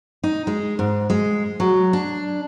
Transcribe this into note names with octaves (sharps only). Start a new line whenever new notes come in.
D#4
G#3
G#2
G#3
F#3
D4